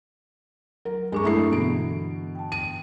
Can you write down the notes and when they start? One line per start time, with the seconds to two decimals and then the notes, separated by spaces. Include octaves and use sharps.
0.85 F#3 A#4
1.12 G2 G#3 D4 A#5 C#6
1.24 A3 E4 E5 A#5 D#6 C7
1.52 B2 D3 E3 B3 D7
2.35 G5 A5
2.52 D#7